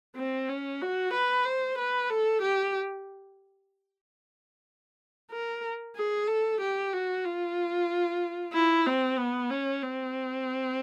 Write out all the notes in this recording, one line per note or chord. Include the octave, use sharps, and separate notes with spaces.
C4
C#4
F#4
B4
C5
B4
A4
G4
A#4
G#4
A4
G4
F#4
F4
E4
C4
B3
C#4
C4